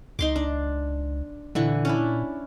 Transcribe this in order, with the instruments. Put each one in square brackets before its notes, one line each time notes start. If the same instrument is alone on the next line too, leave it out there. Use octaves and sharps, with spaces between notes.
[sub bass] C#2 [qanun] D#4 C6 D6
[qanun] D4
[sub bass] A#2 [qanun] D3 E3 C#6
[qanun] C#4 D4 E4